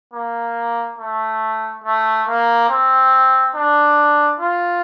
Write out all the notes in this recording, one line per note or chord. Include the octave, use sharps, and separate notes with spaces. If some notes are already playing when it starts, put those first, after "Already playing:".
A#3
A3
A3
A#3
C4
D4
F4